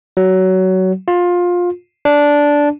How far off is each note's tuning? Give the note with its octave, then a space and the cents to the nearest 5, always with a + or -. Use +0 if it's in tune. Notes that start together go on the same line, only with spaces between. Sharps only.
F#3 +20
F4 +20
D4 -10